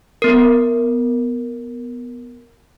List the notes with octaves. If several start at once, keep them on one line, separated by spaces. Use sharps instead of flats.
B3 A#4